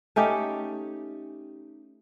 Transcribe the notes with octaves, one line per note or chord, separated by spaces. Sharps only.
A3 C#4 D#4 G4